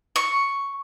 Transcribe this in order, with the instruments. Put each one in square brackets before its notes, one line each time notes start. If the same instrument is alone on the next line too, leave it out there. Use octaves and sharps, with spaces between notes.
[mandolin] C#6